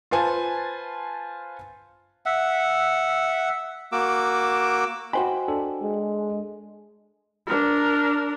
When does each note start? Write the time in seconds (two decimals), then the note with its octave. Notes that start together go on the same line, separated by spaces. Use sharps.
0.11 F4 B4 C5 G#5 A5
2.26 E5 F#5
3.92 A#3 F#4 D6 E6
5.13 F#4 C5 D#5 G5 G#5 B5
5.48 D4 A4
5.82 G#3
7.47 D4 A#4